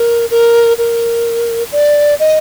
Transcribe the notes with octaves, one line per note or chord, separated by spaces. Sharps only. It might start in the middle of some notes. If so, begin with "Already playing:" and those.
Already playing: A#4
A#4
A#4
D5
D#5